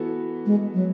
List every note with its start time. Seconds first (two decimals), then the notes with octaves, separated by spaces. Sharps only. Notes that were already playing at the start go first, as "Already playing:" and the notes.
Already playing: E3 B3 F#4 A4
0.46 G#3
0.74 F#3